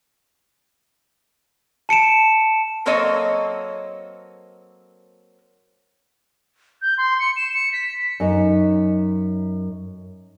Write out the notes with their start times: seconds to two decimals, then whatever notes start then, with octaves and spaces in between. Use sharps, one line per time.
1.89 A5 C#7 D7 E7
2.86 F#3 A#3 C4 A4 C#5 D#5
6.82 G6
6.98 C6
7.20 C#7
7.37 E7
7.54 C#7
7.73 B6
8.20 F#2 D#4